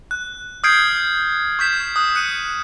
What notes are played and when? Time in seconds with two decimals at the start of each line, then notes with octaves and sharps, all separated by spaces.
0.11 F#6
0.64 D#6 F6 G6 G#6 C7 D7
1.59 C#6 G6 B6 E7
1.96 D#6 F#6
2.15 F#6 C#7 D#7